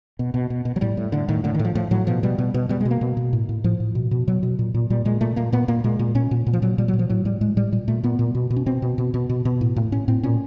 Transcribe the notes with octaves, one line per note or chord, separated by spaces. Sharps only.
B2
B2
B2
B2
F#3
A2 G3
A2
A2 D3
A2 D#3
A2 D3
D#3
A2
F3
A2 F3
A2 F#3
B2 F3
B2 G3
B2
B2
B2 G3
G#3
B2
A#3
B2
B2
A2
A2
A2 F3
A2
B2
B2
B2 F#3
B2
A#2
A#2
A#2 G3
A#2 G#3
A#2 A3
A#2 A#3
A#2 B3
A#2 A#3
A#2 G#3
A#2
A#2 C#4
A#2
A#2
F3
A#2 F#3
A#2 G3
F#3
A#2
F3
A2 F#3
A2 G3
A2 G#3
A2 G3
A#2 G3
A#2 A3
A#2 B3
A#2
B2
B2
C#4
B2 C4
B2
B2
B2
B2
B2
A2
A2
A2 C#4
A2 C4
A#2 C#4